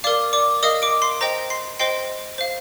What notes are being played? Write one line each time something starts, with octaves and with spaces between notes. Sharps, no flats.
A#4 D5 F5 D6
D5 D6
A#4 D#5 F5 D#6
D6 D7
C6 C7
C5 D#5 G5 A#5 A#6
C6 C7
C5 D#5 G5 C6 C7
C5 F5